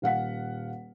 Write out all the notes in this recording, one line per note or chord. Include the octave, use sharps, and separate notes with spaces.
D#1 F5 F#5 B6